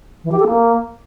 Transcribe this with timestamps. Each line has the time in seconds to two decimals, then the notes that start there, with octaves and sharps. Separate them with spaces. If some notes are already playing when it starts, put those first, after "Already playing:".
0.24 E3
0.32 G4
0.39 A4
0.47 A#3